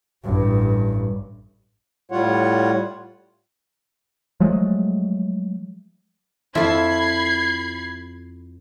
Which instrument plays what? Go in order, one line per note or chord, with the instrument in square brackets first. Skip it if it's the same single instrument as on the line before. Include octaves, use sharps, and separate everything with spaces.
[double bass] A1 G2
[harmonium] A2 G3 F4 C#5 F#5
[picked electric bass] F3 F#3 G#3 A3
[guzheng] F2 F4 E5 [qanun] E4 A4 [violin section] B5 G#6 C7